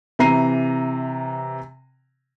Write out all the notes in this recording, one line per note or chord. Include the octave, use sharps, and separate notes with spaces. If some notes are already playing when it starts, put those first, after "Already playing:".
C3 E3 A#5 C7 D#7